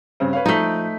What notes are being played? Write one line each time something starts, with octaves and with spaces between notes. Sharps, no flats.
G2 C#3 C4
B4 C#5 F5
F3 A3 D#4 B6